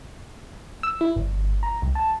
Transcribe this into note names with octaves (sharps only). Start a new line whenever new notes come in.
E6
E4
G1
A#5
C2
A5